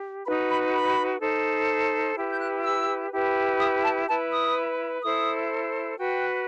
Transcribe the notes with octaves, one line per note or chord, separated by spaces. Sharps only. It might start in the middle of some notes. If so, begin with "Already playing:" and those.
Already playing: G4
D#4 F#4 B4 B5
B5
B5
D#4 A4 C5
E4 G4 B4
G6
F#6
E6
E4 G4 B4
D#6
A5
E4 B4 A5
D#6
E4 A4 C5 D#6
F#4 B4 G5